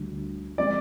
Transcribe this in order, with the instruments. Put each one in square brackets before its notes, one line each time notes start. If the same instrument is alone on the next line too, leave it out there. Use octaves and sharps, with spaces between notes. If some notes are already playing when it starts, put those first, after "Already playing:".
Already playing: [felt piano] D2 D3 G3
[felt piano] F3 G#3 C4 [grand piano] D5